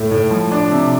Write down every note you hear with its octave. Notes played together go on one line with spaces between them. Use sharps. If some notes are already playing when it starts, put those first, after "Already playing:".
Already playing: A2 A3
A2
F3
D4
C3